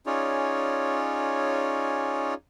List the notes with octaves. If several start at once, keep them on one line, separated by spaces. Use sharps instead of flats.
C#4 D#4 F4 G#4 C#5 D5